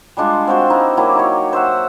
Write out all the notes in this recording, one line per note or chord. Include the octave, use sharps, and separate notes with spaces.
G3 G#3 D4 F4
C4 F4 F#4 C5
D#4 E4
F#3 A#3 E4 G4
D#4 C#5
C5 E5 F#5